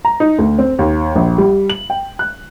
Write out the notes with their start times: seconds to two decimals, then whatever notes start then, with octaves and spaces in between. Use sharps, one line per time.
0.05 A#5
0.20 D#4
0.38 D2
0.58 C4
0.79 D#2
1.15 A#1
1.38 G3
1.70 F#7
1.90 G5
2.19 F#6